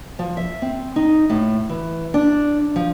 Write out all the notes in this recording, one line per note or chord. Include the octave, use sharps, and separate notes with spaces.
F3
E5
C4
D#4
A2
E3
D4
F3